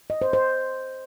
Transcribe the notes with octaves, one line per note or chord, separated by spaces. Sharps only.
D#5
C5
C5